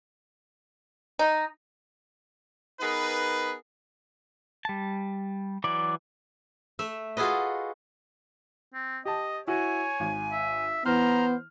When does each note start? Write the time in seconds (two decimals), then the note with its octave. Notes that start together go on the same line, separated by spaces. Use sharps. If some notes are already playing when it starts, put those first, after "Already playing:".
1.19 D#4
2.81 B3 D#4 G#4 A#4 B4
4.65 G3 A5
5.64 E3 F#3 E4 D5
6.79 A3 E5
7.17 F4 F#4 G#4 A4 B4 D#5
8.74 C4
9.05 G4 D#5 A5
9.47 E4 F#4 C#5 G#5
10.00 G#1
10.32 E5
10.86 E3 B3 C5 A#5 F6